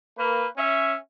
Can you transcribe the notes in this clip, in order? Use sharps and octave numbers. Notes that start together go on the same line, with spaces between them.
A#3 B4
C#4 E5